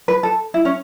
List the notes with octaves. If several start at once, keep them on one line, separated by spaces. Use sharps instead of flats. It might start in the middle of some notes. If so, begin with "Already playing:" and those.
B4
A4
E4
C#4